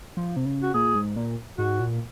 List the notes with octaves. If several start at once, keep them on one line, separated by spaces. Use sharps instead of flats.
F3
C3
C#3
F#4
A#2 G#4
G#2
A#2
G#2 F#4
A#2